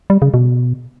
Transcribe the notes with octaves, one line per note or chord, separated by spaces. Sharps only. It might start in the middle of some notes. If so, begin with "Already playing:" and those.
G3
C#3
B2